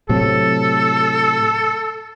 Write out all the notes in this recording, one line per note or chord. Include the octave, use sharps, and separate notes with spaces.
A2 C3 F#3 A4